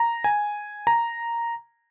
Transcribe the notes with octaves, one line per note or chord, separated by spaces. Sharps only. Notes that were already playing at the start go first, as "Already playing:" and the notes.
Already playing: A#5
G#5
A#5